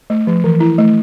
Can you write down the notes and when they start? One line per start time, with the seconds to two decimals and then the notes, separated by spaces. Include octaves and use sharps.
0.10 A3
0.27 F3
0.44 E3
0.60 E4
0.78 A3